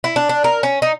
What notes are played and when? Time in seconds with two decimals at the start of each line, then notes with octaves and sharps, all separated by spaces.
0.04 E4
0.16 D4
0.29 D4
0.44 A#4
0.63 C#4
0.82 D#4